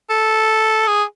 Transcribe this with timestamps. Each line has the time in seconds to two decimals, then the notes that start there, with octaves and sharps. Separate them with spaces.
0.10 A4
0.87 G#4